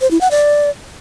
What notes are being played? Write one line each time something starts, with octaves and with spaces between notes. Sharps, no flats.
C5
E4
F#5
D5